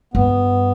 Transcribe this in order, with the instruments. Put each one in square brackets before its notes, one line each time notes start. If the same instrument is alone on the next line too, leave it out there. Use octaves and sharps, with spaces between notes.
[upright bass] G2 [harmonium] B3